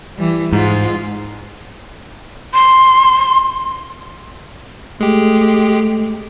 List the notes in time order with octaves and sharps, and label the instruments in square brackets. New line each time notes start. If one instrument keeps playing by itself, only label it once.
[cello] E3 G3
[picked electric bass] G#2 [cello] F4
[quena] C6
[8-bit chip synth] G#3 G4 [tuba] A3